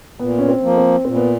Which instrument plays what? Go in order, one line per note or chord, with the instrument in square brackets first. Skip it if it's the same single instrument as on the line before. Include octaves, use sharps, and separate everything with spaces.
[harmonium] A#2 [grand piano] B3
[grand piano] C#4
C4
[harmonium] F3 A#3
[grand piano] C4
[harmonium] A#2 [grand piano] C4
[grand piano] B3